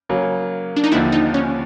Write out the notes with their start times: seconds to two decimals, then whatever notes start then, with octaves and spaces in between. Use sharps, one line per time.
0.09 C#3 F#3 A#3
0.76 D4
0.84 D#4
0.92 D#2 D3 F3 E4
1.12 D#4
1.34 C#4